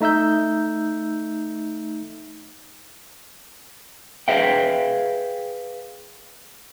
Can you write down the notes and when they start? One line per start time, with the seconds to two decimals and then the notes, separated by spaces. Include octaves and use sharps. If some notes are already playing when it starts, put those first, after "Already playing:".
0.01 A3 D#4 E5 E6 G6
4.28 G#4 B4 E5 F5 G5